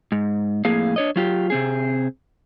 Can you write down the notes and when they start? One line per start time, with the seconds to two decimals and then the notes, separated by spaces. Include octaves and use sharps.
0.12 G#2
0.65 F2 A2 A#3 G#4 F5
0.96 D4 C#5 D#5
1.16 F#3 F4 G4
1.50 C3 C4 G#4